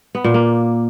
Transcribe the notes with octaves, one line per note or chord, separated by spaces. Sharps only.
B3
A#2
A#3